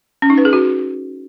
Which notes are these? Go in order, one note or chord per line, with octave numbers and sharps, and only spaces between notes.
C#4
D#4
B4
G#4
F#4